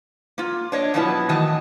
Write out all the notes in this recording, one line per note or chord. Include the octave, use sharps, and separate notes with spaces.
A#3 F4
D4 C#5 D#5
B2 F3 F#3 B3 E4 A5
A2 D#3 E3 F#4 D#5 A5